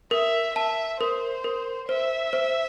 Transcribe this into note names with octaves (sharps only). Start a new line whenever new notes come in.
A#4 E5
E5 A5
A#4 C5
A#4
C5 E5
C5